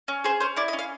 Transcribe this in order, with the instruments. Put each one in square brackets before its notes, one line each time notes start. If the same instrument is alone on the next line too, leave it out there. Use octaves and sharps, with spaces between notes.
[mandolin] C#4
G#4 C5
C#4 C5
E4 D5
D#5
C#4
F5